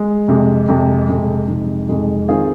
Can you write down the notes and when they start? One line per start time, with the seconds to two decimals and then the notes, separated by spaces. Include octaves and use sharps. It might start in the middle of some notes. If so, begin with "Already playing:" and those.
Already playing: G#3
0.28 F2 C3 G#3
0.68 F2 C3 G#3
1.08 F2 C3 G#3
1.48 F2 C3 G#3 D#4
1.88 F2 C3 G#3 D#4
2.28 D#3 C4 F4 G#4